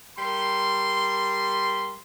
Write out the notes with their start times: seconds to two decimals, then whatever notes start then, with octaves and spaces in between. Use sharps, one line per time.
0.18 G3 A#4 C6